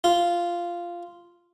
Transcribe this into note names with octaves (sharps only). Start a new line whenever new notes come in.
F4